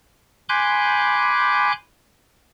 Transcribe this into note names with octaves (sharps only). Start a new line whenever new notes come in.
G#5 B5 C6 D6 F#6 G6